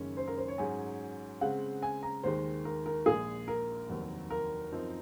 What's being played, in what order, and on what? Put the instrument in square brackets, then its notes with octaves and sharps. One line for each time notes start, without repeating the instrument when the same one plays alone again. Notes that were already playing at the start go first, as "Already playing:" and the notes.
Already playing: [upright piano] F#1 F#2 D#3 G#3 C#4
[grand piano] C5
A#4
C5
C#5
[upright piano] G#2 F#3 C#4 G#4 [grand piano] G#5
[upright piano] C#3 G#3 C4 [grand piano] F#5
[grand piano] G#5
A#5
[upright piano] D#2 D#3 G#3 [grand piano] C5
[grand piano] A#4
A#4
[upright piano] A#1 A#2 G#3 [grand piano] G#4
[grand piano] A#4
[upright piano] F1 D#2 D#3 F#3 C4
[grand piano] A#4
[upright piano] F#2 F3 C4 D#4